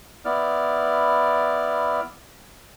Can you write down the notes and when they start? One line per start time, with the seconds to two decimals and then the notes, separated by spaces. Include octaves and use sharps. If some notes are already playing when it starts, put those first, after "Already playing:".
0.25 B3 E4 D5 F6